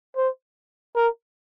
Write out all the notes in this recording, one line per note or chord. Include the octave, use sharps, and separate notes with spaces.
C5
A#4